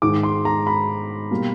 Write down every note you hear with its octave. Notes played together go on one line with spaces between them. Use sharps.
G#2 D#3 G#3 D6
C6
A#5
B5
B2 G3 A#3